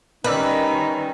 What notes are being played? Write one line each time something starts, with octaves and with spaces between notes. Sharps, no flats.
D#3 G3 C#4 D#4 A#4 B4 D5 E6